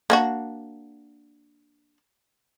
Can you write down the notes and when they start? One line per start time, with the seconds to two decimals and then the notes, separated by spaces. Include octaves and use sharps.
0.10 A#3 D4 F#4